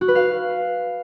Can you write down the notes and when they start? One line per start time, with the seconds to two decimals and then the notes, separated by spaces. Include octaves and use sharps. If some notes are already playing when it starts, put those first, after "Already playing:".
0.01 F#4
0.08 B4
0.15 F5